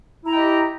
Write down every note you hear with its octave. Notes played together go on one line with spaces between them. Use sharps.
E4 G4 D#5 G5 A#5